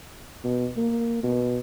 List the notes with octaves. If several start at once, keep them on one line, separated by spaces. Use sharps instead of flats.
B2
A#3
B2